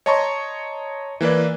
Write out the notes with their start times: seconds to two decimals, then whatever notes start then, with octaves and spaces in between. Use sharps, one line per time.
0.06 C#5 D#5 A5 A#5 C6 C#6
1.21 E3 A#3 B4 D5